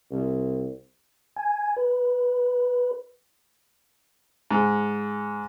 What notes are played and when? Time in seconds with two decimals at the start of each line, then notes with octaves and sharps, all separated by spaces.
0.11 C2
1.36 G#5
1.77 B4
4.51 G#2